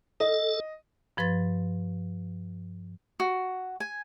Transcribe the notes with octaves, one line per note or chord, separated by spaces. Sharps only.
A4 D#5
G2 F3 B4 C6 A6
F#4
G#5